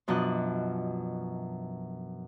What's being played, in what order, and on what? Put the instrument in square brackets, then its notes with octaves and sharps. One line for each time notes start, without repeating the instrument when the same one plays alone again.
[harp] F#2 B2 F3 D4 D#5 F#6